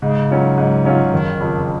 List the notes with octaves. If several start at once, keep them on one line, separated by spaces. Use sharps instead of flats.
G#2 C#3
F#3 C#4 F4
G#2
F#3 C#4 F4
F#1 D#3
F2 C#3